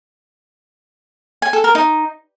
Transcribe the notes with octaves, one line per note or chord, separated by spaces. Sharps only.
G#5
A4
A#4
D#4